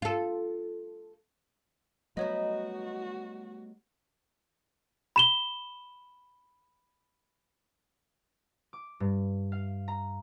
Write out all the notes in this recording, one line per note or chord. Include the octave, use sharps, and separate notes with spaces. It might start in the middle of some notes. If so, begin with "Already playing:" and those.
F4 A4
F#3 G3 A3 B3 D#4 F#4 C#5 D#5
B5 E7 G7
D6
G2
F5
A#5